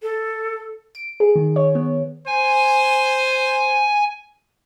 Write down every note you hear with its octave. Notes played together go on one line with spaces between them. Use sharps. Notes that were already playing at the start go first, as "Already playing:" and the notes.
A4
D7
G#4
D#3
C#5
B3
C5 G#5